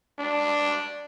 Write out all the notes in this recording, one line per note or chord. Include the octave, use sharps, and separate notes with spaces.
D4